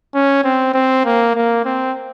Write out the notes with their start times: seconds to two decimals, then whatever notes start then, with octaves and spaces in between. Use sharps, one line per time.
0.14 C#4
0.44 C4
0.74 C4
1.05 A#3
1.35 A#3
1.65 C4